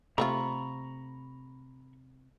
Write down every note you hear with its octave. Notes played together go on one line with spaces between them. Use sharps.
C3 A3 C4 F4 A#5 B5 C#6